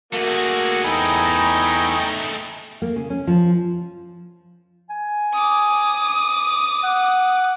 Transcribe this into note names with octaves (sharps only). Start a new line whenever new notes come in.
A3 A#3 F#4 G#4
E2 D#4 G5 G#5 A#5 B5
A#3
C#3
C#4
F3
G#5
D6 D#6
F#5